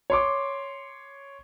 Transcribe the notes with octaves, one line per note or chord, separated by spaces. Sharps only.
C#5 C6 D6